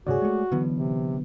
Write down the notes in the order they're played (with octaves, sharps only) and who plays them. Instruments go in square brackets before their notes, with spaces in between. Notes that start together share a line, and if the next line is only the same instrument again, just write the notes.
[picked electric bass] D2 G2 C3 [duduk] F#4 [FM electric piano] G#4 C#5 D5
[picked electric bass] G#3 A3
[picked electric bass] D3 F#3 B3 [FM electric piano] E3
[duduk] C3